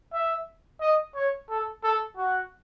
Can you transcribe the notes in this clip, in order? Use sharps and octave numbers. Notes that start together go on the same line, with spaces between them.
E5
D#5
C#5
A4
A4
F#4